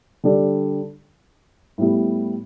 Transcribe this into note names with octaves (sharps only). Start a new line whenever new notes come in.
D3 G3 D4 A4 D5
A2 G3 B3 E4